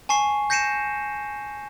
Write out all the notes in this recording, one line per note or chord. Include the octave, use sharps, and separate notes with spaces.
G#5 A5 C#6 C7
G6 A#6 C7 C#7 D#7 E7